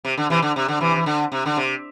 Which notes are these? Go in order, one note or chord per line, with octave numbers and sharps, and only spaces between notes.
C3
D3
C3 E3
D3
C3
D3
C3 E3
E3
D3
C3
D3
C3